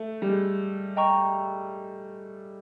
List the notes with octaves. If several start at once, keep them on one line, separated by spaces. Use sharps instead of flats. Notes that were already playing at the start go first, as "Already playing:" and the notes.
Already playing: A3 E5
G3
G#3
D#5 G5 A#5 C#6